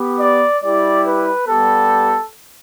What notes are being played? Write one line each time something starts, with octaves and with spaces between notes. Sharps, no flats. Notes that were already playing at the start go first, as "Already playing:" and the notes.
Already playing: B3 G4
D5
G3 E4 G4 D5
B4
G3 B3 G4 A4